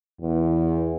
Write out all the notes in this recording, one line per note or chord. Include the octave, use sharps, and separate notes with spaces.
E2